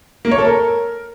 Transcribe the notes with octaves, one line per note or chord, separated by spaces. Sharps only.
A#3
C#5
A4
A#4